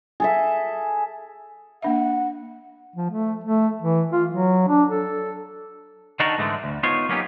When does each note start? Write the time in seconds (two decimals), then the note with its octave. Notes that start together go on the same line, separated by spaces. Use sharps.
0.20 G#4 A4 E5
1.82 A#3 D4 E5 F#5
2.96 F3
3.11 A3
3.44 A3
3.82 E3
4.12 F4
4.30 F#3
4.69 D4
4.88 A4
6.20 D#3 D4 D#4 F#4 A4 A#4
6.38 G#2 D3 E3 G#3 A3
6.64 D2
6.83 B3 D#4 F4 C5 C#5
7.09 F#3 A#3 B3 C#4 D#4 G4